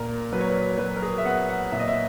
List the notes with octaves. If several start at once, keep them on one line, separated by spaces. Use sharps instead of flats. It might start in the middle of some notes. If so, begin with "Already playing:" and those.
Already playing: A#2 A#4
F#3 B4
C#5
B4
F#3 B4
A#4
G#4
E5
B3 F#5
F#5
A#2 E5
D#5
E5